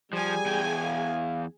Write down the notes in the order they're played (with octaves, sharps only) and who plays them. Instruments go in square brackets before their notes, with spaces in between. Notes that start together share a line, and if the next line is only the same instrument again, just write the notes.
[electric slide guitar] F3 [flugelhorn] G3 [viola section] G#4 G#5
[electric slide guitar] E2 G5
[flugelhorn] F5